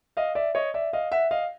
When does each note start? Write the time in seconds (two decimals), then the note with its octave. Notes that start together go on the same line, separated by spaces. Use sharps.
0.17 D#5 F5
0.35 D5 E5
0.55 C#5 D#5
0.74 D5 E5
0.93 D#5 F5
1.12 E5 F#5
1.31 D#5 F5